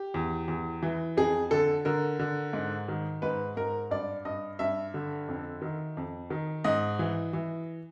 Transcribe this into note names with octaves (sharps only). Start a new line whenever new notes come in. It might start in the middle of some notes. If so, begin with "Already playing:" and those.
Already playing: G4
E2
E2
E3
F2 G#4
D3 A4
D3 A#4
D3
G#2
D#3
G#2 B4
G#2 A#4
G2 D5
G2 D#5
G2 E5
D3
F2
D#3
F2
D#3
G#2 D#5
E3
E3